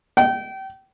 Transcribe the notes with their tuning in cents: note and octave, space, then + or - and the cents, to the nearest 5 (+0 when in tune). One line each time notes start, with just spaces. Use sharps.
G5 -30